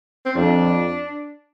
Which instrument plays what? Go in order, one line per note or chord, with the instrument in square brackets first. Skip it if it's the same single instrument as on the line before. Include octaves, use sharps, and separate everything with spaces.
[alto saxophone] C4
[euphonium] F2 [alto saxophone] D4